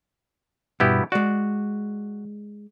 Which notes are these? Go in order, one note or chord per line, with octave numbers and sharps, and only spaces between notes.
G2 B2 B3 E4 G4
G#3 F#4 D5